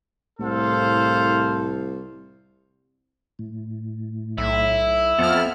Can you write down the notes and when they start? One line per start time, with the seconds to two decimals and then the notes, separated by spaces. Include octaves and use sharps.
0.40 C2 A2 A4 C5 F5
3.39 A2
4.38 B1 E4
5.19 F2 B3 A5 F6